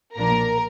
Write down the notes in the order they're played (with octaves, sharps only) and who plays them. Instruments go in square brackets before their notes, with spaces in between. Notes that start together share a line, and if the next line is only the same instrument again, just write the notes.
[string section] B1 A#2 F3 A#3 D4 A#4 A#5